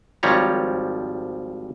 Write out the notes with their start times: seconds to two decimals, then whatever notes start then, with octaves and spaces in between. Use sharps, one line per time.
0.23 G#1 F3 G3 C#5 A#5